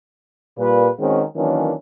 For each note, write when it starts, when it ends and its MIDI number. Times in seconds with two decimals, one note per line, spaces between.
0.58 0.88 46
0.58 0.88 55
0.58 0.88 71
0.99 1.22 51
0.99 1.22 56
0.99 1.22 60
0.99 1.22 61
0.99 1.22 66
1.36 1.72 51
1.36 1.72 52
1.36 1.72 54
1.36 1.72 58
1.36 1.72 61
1.36 1.72 62